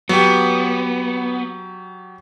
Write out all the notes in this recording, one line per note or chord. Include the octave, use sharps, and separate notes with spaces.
F#3 B3 G4